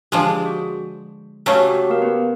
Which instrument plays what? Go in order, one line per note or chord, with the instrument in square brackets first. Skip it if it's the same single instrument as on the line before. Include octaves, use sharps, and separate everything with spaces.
[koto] D3 F3 G#3 [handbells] G4
[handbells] G#4
F#4
[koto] C#3 F#3 A3 C#4 [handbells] G4
[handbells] F#4
G4
F#4
G4
A#3 A#4
B3 B4